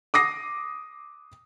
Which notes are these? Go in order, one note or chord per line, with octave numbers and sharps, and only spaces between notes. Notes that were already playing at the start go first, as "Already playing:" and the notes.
D6 D#6 A#6 C7